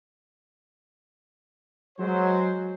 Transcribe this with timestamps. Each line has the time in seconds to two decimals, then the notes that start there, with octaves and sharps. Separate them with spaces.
1.98 F#3 G#3 C5